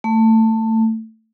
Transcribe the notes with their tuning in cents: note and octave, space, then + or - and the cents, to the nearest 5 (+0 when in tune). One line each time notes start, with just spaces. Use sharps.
A3 +20